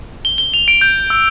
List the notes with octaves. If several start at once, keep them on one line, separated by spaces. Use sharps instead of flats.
G7
G7
F7
D7
G6
E6